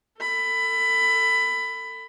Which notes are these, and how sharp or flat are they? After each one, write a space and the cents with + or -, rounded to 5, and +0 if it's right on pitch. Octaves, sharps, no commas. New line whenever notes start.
A4 +30 B5 +15